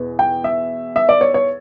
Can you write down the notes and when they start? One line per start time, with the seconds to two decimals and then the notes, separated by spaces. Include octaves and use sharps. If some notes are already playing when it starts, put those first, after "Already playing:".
Already playing: E2 B2 B3
0.19 G5
0.44 E5
0.96 E5
1.09 D5
1.21 C#5
1.34 C#5